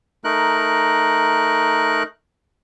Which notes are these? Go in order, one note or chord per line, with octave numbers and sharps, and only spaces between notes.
A3 D#4 A#4 F#6